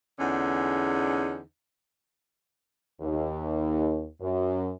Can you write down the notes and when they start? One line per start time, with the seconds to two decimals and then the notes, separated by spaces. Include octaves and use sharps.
0.20 E2 D3 C#4 D#4
3.01 D#2
4.21 F#2